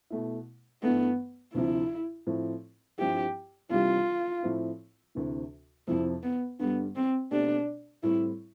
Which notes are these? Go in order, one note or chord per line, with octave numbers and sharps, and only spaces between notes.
B2 A3 E4
G2 E3 A3 B3
D2 C3 F3 C4 E4
A2 F3 C4 E4
G2 F3 C4 E4 G4
C3 E3 G3 D4 F4 G4
A2 F3 C4 E4
D2 C3 E3
F2 C3 F3 E4
B3
G2 D3 G3 B3
C4
B2 A3 C4 D4 G4
A2 G3 C4 E4